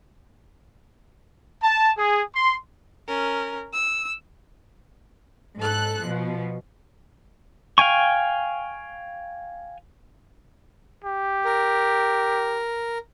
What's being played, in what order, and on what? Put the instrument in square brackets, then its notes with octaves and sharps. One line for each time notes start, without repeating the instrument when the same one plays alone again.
[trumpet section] A5
G#4
C6
[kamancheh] C#4 A#4
E6
[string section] G#2 A4 F#6
B2 F3
[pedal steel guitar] F5 G5 G#5 C#6
[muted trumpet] G4
[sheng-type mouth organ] A#4